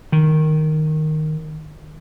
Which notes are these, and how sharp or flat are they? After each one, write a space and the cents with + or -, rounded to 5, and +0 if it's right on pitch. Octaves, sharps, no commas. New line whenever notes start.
D#3 -5